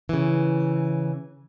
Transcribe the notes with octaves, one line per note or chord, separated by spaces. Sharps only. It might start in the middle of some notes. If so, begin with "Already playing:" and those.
C#3 E3